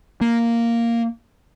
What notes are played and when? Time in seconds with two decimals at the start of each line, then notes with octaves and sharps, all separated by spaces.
0.21 A#3